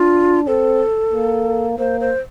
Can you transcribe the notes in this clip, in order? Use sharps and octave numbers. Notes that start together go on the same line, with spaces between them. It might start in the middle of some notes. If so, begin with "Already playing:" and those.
Already playing: D4 F4
C4 A4
A#3
A#3 C5
C5